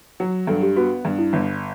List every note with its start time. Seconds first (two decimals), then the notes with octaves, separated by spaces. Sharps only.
0.20 F#3
0.47 G2 A4
0.63 G4
0.76 B3 F#4
1.05 G2
1.19 E4
1.33 G1